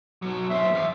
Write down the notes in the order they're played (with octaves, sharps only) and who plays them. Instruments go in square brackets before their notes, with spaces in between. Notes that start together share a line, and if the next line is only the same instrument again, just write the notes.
[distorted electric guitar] B1 F#3
[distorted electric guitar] F#2 C5 [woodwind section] E5
[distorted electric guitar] E2 F5